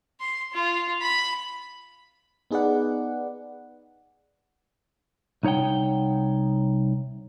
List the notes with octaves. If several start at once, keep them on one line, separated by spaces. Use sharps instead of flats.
C6
F4
B5
B3 D#4 G#4 B4 D5 F#5
C2 D#4 C#5 F#5 G5